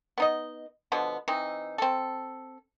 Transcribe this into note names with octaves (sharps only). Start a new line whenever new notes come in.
B3 D#4 D#5
B2 D3 F3 B3
E3 C4 D#4
C4 A4